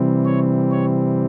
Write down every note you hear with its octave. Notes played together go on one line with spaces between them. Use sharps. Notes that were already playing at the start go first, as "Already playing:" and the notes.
Already playing: C3 E3 G3 C4
C#5
C#5